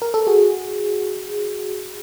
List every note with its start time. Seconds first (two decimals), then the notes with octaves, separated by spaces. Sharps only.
0.02 A#4
0.14 A4
0.27 F#4 G#4